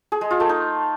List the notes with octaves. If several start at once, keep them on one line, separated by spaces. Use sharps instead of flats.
G#4
G#3
F4
A3
D#4